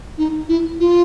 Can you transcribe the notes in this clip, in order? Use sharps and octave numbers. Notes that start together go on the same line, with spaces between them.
D#4
E4
F4